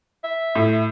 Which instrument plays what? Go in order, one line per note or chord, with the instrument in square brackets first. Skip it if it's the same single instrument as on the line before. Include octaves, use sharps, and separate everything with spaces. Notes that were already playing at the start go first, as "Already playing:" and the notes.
[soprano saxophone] E5
[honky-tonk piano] A2